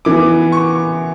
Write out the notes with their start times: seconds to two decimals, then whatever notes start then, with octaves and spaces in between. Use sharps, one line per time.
0.05 E3 B3 D6
0.52 C#6